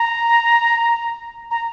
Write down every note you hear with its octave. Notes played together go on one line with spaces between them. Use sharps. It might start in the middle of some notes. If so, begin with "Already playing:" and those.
Already playing: A#5
A#5